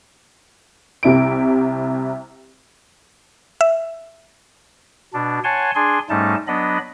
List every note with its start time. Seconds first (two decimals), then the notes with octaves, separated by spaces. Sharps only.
1.03 C2 C3 E4 D7
3.61 E5
5.14 B2 D4
5.44 C#5 F#5 G#5 A5 C6
5.75 D4 G#4 G#5 C6
6.10 G#2 G3 A3 C#4 D#4 A5
6.48 F#3 B3 D4 D#5 B5